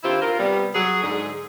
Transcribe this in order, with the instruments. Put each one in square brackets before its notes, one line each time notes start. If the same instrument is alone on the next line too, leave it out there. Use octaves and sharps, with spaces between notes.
[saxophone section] D3 D#3 C4 E4 F4 G4
F4 A#4
C3 G3 B3
F#3 G#4
G#2 D3 G#4